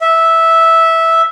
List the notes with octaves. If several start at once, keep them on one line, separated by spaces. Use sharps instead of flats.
E5